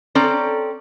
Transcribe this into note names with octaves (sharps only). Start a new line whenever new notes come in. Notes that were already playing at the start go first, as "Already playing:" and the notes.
C4 C#4 A4 D5 A#5